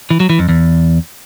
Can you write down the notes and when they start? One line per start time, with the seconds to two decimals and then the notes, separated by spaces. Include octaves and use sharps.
0.11 E3
0.20 F#3
0.30 E3
0.39 F2
0.49 E2